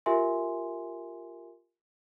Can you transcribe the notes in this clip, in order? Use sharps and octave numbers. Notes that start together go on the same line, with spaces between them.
F4 G4 A#4 E5 G#5 C6